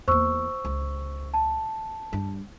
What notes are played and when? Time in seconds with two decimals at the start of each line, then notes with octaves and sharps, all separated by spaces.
0.08 E2 A#3 C5 C#6 E6
0.65 C#2
1.34 A5
2.13 G2